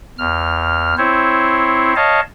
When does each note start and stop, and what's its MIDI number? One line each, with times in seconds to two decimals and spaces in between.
0.18 0.95 40
0.18 0.95 89
0.98 1.94 60
0.98 1.94 64
0.98 1.94 72
0.98 1.94 73
1.96 2.20 73
1.96 2.20 75
1.96 2.20 77
1.96 2.20 81